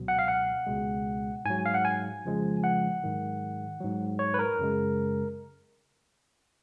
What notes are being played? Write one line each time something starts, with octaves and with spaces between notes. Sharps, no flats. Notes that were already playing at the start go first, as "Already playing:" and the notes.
Already playing: C#2 B2 F#3
F#5
F5
F#5
C#2 B2 G#3
G#2 F#3 G#5
F5
F#5
G#5
F2 C#3 F3 G#3
F#5
G#2 D#3 F#3
G#2 F#3
C#5
B4
A#4
F#2 C#3 G#3